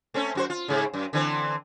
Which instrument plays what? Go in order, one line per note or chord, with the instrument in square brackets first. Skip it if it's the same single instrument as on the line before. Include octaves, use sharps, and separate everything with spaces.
[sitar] A3 C4 C#4
F#2 F#4 C5
F4
G#2 C#3
F#2
D3 E3 C4